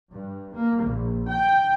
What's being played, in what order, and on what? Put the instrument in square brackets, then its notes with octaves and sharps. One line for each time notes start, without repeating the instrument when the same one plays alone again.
[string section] G2
A#3
A#1
G5